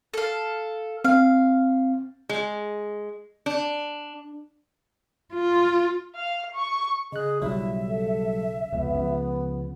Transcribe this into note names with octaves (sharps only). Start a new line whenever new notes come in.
A4 F5
C4 F5
G#3
D4
F4
F5
C#6
C#3 G#4 D#5 F#6
B1 C#3 F#3 G3 E4 E5
A4
F1 C#2 B3
C#3 F3